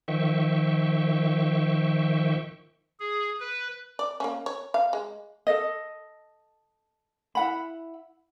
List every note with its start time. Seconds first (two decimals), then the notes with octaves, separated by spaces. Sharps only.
0.08 D#3 F3 E5 G5 C#6
3.00 G#4
3.40 B4
3.99 D5
4.20 A#3 C#4
4.46 C#5
4.74 F5
4.93 G#3
5.47 A4 D#5
7.35 E4 F#5 B5